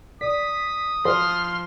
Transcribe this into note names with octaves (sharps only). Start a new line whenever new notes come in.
D5 D#6 B6
F3 C5 C6 F6